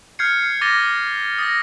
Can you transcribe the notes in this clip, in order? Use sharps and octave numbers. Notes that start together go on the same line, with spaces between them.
F6 G6 G#6 C7 C#7
D6 A6 A#6 D#7 G7
D#6 A6 A#6